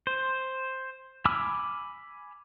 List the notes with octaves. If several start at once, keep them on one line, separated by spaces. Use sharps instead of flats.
C5
G#5 B5 D6 E6 F6